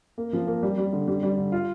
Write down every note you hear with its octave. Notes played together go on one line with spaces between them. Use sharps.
A#3
F3
A#3
G3
G3
D3
G3
G3
D3
F4